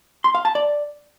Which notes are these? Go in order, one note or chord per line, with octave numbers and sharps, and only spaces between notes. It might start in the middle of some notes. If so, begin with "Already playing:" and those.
C6
F5
A5
D5